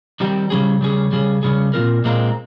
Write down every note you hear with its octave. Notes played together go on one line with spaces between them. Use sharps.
D#3 G3 C4 G4
C#3 G3 C#4 G#4
C#3 G3 C#4 G#4
C#3 G3 C#4 G#4
C#3 G3 C#4 G#4
A#2 G#3 C4 F4 A#4
A#2 G#3 C4 F4 A#4